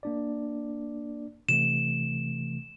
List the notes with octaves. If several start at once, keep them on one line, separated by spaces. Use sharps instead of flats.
A#3 D4 D5
C3 E3 A3 E7